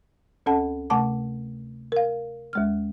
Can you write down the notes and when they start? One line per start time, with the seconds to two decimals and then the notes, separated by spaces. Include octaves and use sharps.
0.46 D2 C#4 A4 F#5 A5
0.90 C3 A3 F#5 A5 D6
1.92 A#4 F5
2.53 D#2 G#3 F6